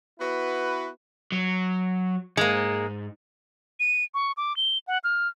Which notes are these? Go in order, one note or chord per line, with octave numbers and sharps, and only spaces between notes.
B3 E4 F#4 B4
F#3
G#2 G#3 A#3
D#7
C#6
D6
G7
F#5
F6